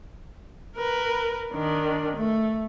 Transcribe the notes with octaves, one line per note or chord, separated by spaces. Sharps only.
A#4 B4
D#3 D4
A3